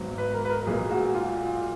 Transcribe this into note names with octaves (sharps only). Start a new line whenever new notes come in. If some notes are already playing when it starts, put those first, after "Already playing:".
Already playing: G#1 G#2 F#3 B3
B4
A#4
B4
A#4
B1 A#2 G#3 G#4
F#4
F4